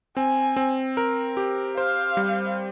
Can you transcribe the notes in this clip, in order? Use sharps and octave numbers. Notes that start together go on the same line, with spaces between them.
C4 G#5
C4
A#4
G4
C5 F5
G3